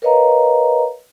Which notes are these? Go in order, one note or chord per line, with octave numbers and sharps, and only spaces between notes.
A#4 B4 C#5 D#5 F5 A#5